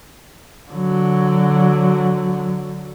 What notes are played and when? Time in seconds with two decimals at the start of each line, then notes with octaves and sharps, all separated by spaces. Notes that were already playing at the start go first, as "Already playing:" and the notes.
0.70 D3 F#3